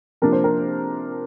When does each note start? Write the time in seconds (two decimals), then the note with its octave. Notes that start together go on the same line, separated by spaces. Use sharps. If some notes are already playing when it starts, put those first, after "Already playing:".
0.22 C3 F3 A#3 D4 A#4
0.32 C5
0.44 A#4